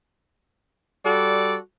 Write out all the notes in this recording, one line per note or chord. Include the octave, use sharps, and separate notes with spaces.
G3 F#4 A4 D5